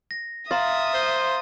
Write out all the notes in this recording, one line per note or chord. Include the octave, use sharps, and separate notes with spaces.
A#6
E5 F5 A#5 C6 D#6 A6
C5